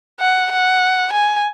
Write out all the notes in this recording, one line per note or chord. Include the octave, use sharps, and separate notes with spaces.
F#5
F#5
G#5